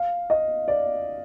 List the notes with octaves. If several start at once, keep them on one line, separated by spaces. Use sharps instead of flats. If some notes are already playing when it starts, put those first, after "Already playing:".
Already playing: F5
D#5
D5